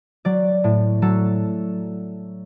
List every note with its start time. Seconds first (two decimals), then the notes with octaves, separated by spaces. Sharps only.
0.25 F#3 D5
0.64 A2
1.02 F#3 A4